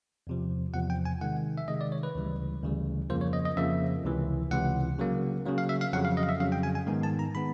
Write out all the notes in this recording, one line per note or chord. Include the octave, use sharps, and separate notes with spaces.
E2 C3 F3
E2 C3 F3 F#5
G5
G#5
C3 D#3 G#3 F#5
E5
C3 D#3 G#3 D#5
D5
C#5
B4
D2 C#3 E3 G3
D2 C#3 E3 G3
F2 C#3 F3 A#3 C5
C#5
D#5
D#5
F2 C#3 F3 A#3 E5
C#2 C3 E3
C#2 C3 E3 F#5
C#3 F#3 A#3
C#3 F#3 A#3
F5
E5
F5
F2 C#3 F#3 F#5
F5
D#5
F5
E5
F2 C#3 F#3 F5
G5
G#5
G#5
G#2 D#3 G#3 B3 D#4
A5
A#5
D#3 G#3 B3 D#4 B5